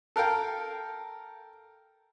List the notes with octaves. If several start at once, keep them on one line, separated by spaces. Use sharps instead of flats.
A4 A#4 F5 G5